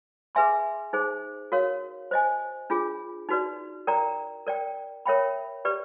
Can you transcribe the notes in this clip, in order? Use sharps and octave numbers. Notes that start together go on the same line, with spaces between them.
G#4 B4 E5 G#5 C6
D#4 G#4 C5
F#4 A#4 C#5 F5
C5 D#5 G#5
D4 F4 G#4
D#4 F#4 B4 D5
A#4 D5 G5 A#5
A#4 D5 G5
A#4 C#5 E5 G5 B5
G4 B4 D5